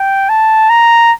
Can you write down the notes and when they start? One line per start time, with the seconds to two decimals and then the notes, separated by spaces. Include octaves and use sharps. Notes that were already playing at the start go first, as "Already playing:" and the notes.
Already playing: G5
0.29 A5
0.70 A#5